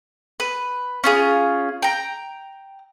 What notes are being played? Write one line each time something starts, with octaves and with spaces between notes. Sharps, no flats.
B4
C#4 F4 G#4
G5 A#5